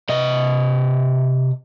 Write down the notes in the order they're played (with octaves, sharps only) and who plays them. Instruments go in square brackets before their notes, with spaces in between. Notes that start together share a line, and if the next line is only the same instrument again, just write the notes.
[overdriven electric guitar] C3 D#5